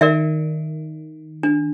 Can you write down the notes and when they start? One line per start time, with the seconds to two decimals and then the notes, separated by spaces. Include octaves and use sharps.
0.01 D#3 A#4 D5 E5
1.43 D4